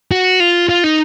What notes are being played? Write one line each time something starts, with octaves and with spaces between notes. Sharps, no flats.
F#4
F4
F4
D#4